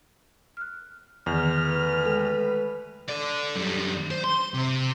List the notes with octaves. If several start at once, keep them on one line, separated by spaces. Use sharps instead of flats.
F6 F#6
E2 D3 D#3 F6 G6
A3 B4
G#3 A4 G5
A4 D5
F#2 G3
C5
C6
C3